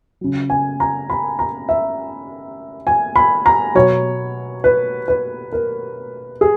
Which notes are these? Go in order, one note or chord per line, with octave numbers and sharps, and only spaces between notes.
C#3 F#3
G#5
A#5
B5
A#5
E5
G#5
B5
A#5
B2 F#3 C#5
B4
B4
A#4
G#4